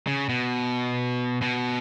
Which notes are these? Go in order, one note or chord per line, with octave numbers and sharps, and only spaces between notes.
C#3
B2
B2